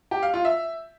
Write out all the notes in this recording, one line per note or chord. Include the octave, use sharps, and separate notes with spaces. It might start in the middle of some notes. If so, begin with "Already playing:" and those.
G4
F5
F4
E5